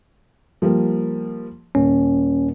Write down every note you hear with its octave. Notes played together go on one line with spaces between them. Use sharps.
F3 G3 A#3
D#1 C#4